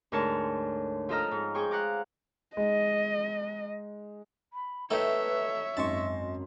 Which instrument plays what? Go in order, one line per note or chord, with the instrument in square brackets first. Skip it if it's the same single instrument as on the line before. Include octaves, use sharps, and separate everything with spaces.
[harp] D2 G#2 A#4 C#5 A5
F3 F4 A4 D#5 A#5 F6
G#2
G#4 C5 G5 C#6
F5 F#5 A#5 D6
[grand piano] G#3 D#4 [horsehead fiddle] D#5
[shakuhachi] B5
[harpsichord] A3 D#4 G5 [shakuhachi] B4 [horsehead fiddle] C#5 E5
[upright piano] G#1 F#2 C6 [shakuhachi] D#5 [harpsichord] A5 C#6